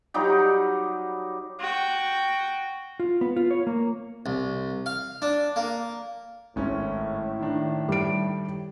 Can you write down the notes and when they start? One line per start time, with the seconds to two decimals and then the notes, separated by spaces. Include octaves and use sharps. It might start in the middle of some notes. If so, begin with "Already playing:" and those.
0.14 F#3 G3 D#4 G4
1.59 F#4 G5
3.00 F4
3.21 B3
3.36 F4
3.51 C#5
3.67 A#3
4.26 C2
4.86 F5
5.22 D4
5.56 A#3
6.56 G#1 A2 C#4 E4
7.40 D#3 D4
7.89 G3 D7